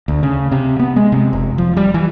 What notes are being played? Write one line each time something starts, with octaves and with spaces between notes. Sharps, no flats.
D2
C#3
C3
B3
G#3
C3
F1
F3
G3
E3